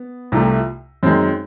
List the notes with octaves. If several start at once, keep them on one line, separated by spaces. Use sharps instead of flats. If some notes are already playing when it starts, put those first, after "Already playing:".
Already playing: B3
C2 C3 F3 A3
F#2 D#3 G#3 C4